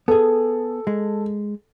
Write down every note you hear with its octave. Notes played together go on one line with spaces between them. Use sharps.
B3 G#4 A4
G#3